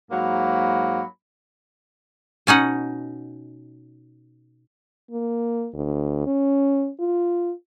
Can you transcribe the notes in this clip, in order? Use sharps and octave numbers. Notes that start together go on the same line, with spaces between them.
G#2 F#3 A#3 B5
B2 C#4 D#4 F#5
A#3
D2
C#4
F4